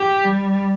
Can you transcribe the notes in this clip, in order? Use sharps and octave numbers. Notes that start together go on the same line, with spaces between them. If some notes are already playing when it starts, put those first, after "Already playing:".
Already playing: G4
G3